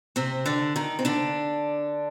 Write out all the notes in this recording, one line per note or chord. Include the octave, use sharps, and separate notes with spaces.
C3 C4
D3 D4
D#3 D#4
C4
D3 D4